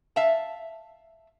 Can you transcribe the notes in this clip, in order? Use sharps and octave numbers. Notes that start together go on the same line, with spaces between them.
E5 F5 A5